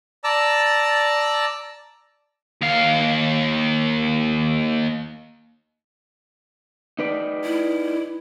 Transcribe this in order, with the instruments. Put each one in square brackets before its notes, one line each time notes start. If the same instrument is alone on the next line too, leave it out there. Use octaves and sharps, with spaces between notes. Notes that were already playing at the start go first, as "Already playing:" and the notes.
[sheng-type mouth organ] D5 A5 A#5 E6
[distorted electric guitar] D#2 F5
[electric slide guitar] D#4 B4 D5
[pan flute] E4